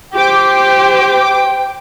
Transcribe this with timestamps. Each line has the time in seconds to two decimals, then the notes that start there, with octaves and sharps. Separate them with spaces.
0.14 G4 C5 G5 D6